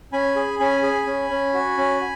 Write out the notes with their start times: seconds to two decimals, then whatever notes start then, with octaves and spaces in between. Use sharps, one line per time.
0.13 C#4 G#5 B5
0.36 G#4
0.59 C#4 G#5 B5
0.83 G#4
1.07 C#4
1.30 C#4
1.54 F#4
1.77 C#4